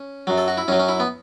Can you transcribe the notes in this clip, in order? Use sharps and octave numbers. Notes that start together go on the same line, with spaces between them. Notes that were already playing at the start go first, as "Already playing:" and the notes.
Already playing: C#4
F#2 F#3
A4
F#4
E4
F#2 F#3 C#4
C#4
E4
B3